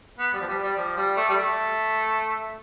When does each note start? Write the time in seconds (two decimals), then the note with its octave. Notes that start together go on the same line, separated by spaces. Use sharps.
0.18 B3
0.33 G3
0.40 F3
0.48 G3
0.63 G3
0.77 F3
0.97 G3
1.16 A3
1.29 G3
1.37 A3